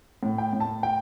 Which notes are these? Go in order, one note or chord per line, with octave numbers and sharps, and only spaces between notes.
A2
G5
A2
A5
G5